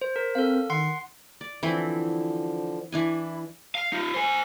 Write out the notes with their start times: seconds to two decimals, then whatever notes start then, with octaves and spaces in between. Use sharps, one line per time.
0.02 C5
0.16 A#4
0.35 C4 A4 F5
0.70 D#3 F#5 C6 C7
1.41 D5
1.63 D3 E3 F3 C4 E4
2.92 E3 D4 E4 G#5
3.75 F5
3.93 D#4 F4
4.14 C5 G#5